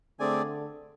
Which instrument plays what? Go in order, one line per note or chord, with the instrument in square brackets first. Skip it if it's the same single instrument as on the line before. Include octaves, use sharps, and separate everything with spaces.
[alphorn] D3 [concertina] A3 C4 G#4 D5 G#5